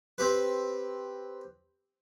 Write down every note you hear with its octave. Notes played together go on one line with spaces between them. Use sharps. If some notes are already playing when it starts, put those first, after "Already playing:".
C4 G4 B4